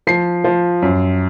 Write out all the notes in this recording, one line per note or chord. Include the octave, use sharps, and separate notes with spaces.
F3 C7
F3
F#2